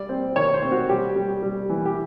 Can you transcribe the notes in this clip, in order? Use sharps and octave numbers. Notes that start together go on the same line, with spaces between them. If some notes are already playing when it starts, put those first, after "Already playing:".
Already playing: G3 D5
C4
D#3 C#5
C5
C4
F#4
G3 G4
G3
G3
E3
G4